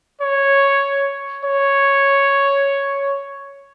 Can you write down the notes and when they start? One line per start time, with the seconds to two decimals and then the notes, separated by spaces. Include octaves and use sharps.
0.22 C#5
1.45 C#5